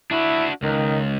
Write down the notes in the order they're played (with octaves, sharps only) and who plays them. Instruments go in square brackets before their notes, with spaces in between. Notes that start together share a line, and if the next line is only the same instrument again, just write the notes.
[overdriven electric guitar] D4 F#4 [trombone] E4
[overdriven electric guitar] C#2 [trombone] D#3